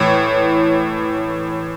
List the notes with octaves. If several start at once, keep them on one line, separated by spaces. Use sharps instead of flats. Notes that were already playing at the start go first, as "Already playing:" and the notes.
Already playing: A2 E3 C#5